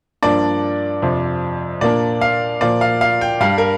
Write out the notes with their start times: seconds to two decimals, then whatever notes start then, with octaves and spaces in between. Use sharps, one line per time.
0.22 G2 F3 A#3 D4 D5
1.02 F2 C3 F3
1.81 A#2 A#3 D4 D5
2.21 F5
2.61 A#2 F3 A#3 D5
2.81 F5
3.01 F5
3.21 G5
3.40 G2 G3 D4 F5
3.58 A#4